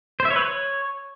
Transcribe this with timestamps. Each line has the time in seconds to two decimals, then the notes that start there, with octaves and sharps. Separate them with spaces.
0.20 C5
0.25 E5
0.30 C#5
0.36 B4
0.41 C#5